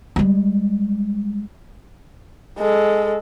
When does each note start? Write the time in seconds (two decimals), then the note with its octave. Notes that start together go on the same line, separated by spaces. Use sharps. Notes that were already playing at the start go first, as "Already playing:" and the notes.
0.16 G3 G#3
2.58 G#3 A4